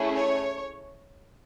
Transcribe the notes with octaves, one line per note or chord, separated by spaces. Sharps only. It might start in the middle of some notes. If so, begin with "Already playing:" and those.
Already playing: A3 C#4 E4 G#4
C#5